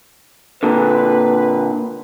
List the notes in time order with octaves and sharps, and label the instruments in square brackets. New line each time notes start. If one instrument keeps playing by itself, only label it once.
[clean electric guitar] A#2 D3 [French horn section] B4